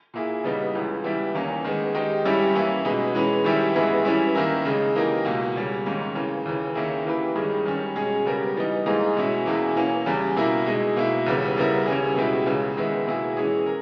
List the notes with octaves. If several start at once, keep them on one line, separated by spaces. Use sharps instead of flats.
A#2 A#3 E4 G#4
C#3 G3 B3 D#4
C#2 C#3 E3
E3 G3 B3 E4 G4
E2 D#3 A#3 C#4
D#3 G#3 B3
D#3 G#3 D#4 G4
G2 G3 C#4 E4 G4
E3 A#3 C#4 E4
B2 G#3 D#4 G#4 B4
E3 G#3 C#4 G#4 B4
D#3 G3 C#4 E4 G4
G2 E3 G#3 B3 E4
E3 G3 C#4 E4
D#3 A#3 E4 A#4
C#3 G#3 D#4
E3 A#3 D#4 G4 A#4
C#2 B2 A#3
C#3 G3 C#4
G#2 D#3 A#3 C#4
C#3 E3 A#3
D#2 C#3 E3
D#3 A#3 C#4 E4 G#4
E3 A#3 E4 G4 B4
G2 D#3 G#3 C#4 G#4
D#3 G3 C#4
B2 G#3 C#4 G#4
C#3 G3 B3 G4 A#4
E3 G3 B3 D#4
G#2 E3 A#3 D#4 G#4
B2 G#3 C#4 E4
E2 B2 A#3 E4 G#4
E3 A#3 C#4
E2 C#3 G3
B2 A#3 E4 A#4
B2 G#3 D#4
B2 A#3 E4
D#2 C#3 G3 B3
C#3 G3 B3 E4 A#4
D#2 C#3 G3 C#4 G#4
B2 G#3 B3 E4 G4
C#2 C#3 E3
D#3 G#3 B3 E4
B2 A#3 E4 G#4
E3 G#3 C#4 G#4
A#4